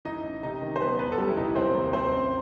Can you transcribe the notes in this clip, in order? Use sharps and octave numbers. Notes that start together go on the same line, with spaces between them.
E3 D#4 D#5
A1
C3 D#4 D#5
D#3
C5
F#3 B3 B4
E2 B3 B4
A4
F#3 G3 G4
E4
C2 D#4
E4
F#3 C4 C5
D#2
F#3 C4 C5
A1